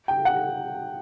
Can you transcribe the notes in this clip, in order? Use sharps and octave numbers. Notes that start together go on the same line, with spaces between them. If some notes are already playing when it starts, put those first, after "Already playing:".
G5
F#5